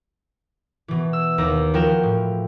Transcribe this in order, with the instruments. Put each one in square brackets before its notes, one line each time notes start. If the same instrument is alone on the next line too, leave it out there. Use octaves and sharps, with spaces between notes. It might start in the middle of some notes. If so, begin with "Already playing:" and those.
[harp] B2 E3
E6
D#2 A#5
F3 F#4 A#4 G5 G6 E7
A2